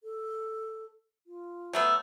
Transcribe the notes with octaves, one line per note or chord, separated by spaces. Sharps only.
A4
F4
F#3 A3 B3